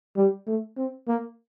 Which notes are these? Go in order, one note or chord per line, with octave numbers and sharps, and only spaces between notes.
G3
A3
C4
A#3